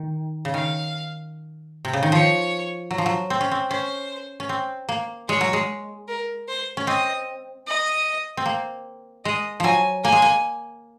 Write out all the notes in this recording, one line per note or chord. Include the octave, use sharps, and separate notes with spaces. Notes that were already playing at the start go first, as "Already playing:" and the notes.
Already playing: D#3
C#3
D#3 F5
C3
C#3
D#3
F3 C#5
F#3
F3
F#3
C4
C#4
C4
C#4 C5
C#4
C4
A#3
G#3 C#5
F#3
G#3
A#4
C5
C#4
C4 D#5
D#5
C4
A#3
G#3 D#5
F3 F#3 G#5
A#3 G#5
G#3
A#3